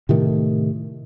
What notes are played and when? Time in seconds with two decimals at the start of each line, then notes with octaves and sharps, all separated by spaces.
0.09 A2 C3 D#3 A3